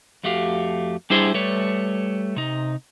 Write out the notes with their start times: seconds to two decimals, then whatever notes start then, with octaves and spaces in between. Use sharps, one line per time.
0.23 F2 A3 F#4 G4 F5
1.10 G3 D4 E4 G#4 C5
1.34 G3 A3 B4 C#5
2.36 C3 D#4